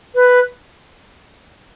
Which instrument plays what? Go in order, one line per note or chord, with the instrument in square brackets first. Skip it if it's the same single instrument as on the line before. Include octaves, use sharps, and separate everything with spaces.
[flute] B4